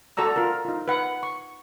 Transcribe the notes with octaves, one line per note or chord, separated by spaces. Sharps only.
F#4 A4 D5 A#5 E6
F4 A#4
D#4 F4
B4 F#5
C#6